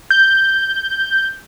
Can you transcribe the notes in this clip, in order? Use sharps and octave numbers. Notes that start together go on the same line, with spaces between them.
G6